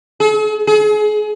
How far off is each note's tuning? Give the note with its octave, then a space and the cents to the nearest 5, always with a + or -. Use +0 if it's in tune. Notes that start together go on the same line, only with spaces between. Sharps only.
G#4 +45
G#4 +30